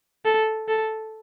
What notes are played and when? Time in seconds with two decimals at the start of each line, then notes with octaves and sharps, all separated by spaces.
0.25 A4
0.68 A4